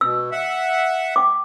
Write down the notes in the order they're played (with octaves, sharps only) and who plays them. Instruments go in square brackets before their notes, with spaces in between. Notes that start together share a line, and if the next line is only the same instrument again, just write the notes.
[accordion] B2 [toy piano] E6
[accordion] E5 F#5
[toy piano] G5 D6